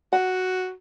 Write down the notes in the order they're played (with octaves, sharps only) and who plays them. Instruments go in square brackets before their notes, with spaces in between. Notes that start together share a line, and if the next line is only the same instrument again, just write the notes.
[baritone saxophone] F#4 [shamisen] F#5